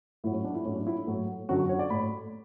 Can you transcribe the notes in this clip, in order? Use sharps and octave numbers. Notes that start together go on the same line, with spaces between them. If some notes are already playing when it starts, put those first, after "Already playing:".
A2 F#3 E4
C#4
D4
E4
A2 F#3 C#4
D4
E4
A2 F#3
F#2 D3 F#3 F#4
F#4
C#5
D5
A2 B5